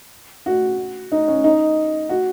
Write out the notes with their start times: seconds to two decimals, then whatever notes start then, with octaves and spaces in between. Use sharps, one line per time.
0.46 F#4
1.12 D#4
1.28 C#4
1.44 D#4
2.09 F#4